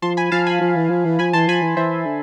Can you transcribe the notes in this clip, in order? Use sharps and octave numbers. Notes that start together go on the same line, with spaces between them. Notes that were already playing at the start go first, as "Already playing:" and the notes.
F3 A5 C6
G#5 B5
F3 F5 A5
G#5 B5
F3
E3
F3
E3
F3 G#5 B5
E3 A5 C6
F3 G#5 B5
E3
E3 C5 E5
D3